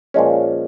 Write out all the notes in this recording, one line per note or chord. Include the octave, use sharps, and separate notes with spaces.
A#2 F3 G#3 C#4